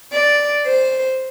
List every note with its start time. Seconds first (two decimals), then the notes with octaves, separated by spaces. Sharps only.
0.12 D5
0.66 C5